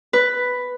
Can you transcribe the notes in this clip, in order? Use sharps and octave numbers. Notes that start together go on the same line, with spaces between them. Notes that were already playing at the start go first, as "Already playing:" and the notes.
B4